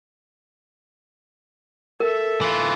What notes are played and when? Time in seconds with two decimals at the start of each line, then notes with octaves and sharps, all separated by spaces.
2.00 A4 A#4 E5
2.41 E3 F4